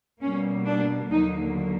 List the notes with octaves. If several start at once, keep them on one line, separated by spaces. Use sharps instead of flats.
B2 G3 A#3 C#4
D4
D#2 D3 F#3 A#3 D#4